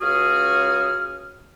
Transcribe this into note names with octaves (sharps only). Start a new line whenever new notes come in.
C#2 C#3 F#4 G#4 D#6 F6